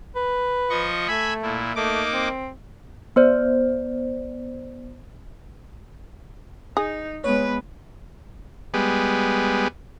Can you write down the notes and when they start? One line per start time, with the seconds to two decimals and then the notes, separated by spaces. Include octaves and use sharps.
0.15 B4
0.70 F3 D#5 C#6
1.08 A3 E5 G#5 B5
1.42 A#2 E4
1.76 A3 A#3 D#4 D6
2.13 C4
3.16 B3 C5 D5
6.77 D#4 G#4
7.24 G#3 B3 B4 C#5
8.74 G3 G#3 B3